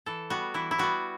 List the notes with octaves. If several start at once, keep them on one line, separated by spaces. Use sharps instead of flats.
E3 A4
G3 B3 F#4
E3 E4
E4
G3 B3 F#4